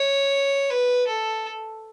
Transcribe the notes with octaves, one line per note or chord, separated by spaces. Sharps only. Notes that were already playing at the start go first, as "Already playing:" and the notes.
Already playing: C#5
B4
A4